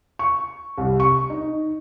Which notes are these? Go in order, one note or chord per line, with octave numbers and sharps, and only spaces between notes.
C#6
C2
C#6
D#4